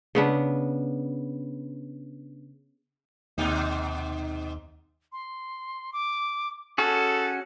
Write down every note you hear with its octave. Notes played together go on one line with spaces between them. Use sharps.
C#3 B3 D4
D#2 G#2 B2 D#4
C6
D6
C#4 F#4 G#4 A4 C#7